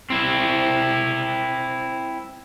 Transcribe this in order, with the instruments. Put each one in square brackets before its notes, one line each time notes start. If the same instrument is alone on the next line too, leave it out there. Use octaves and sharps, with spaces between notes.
[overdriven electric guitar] C4 E4